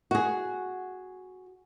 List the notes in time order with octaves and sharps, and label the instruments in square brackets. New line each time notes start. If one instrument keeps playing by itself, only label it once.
[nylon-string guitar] F#4 G#4